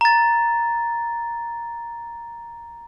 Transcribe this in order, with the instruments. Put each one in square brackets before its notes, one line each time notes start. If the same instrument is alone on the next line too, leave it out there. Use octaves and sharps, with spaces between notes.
[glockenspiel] A#5 A6